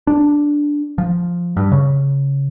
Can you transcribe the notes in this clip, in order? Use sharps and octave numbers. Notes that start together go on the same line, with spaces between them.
D4
F3
G2
C#3